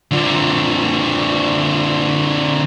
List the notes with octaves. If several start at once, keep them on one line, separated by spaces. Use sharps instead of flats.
D3 F3